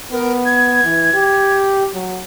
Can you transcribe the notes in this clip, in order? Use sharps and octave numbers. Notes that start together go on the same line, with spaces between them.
B3 A#4
G#6
E3
G4
F#3